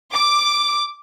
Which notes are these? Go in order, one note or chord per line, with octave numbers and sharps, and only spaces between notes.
D6